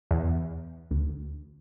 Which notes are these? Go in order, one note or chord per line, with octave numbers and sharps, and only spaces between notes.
E2
D2